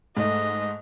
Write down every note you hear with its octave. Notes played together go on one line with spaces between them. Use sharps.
G#2 A3 D#5